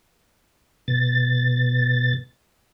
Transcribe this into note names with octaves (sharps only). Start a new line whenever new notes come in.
B2 A6